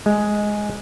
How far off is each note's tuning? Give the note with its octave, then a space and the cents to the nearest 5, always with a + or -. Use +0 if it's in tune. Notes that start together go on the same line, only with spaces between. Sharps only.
G#3 +5